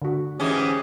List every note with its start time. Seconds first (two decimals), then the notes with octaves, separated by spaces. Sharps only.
0.02 D3 F#4
0.40 G#2 E3 C#4 G4 G#4